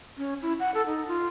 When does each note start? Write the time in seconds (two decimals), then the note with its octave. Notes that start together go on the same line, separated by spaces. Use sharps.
0.17 C#4
0.42 E4
0.60 F#5
0.74 A4
0.86 D#4
1.08 F4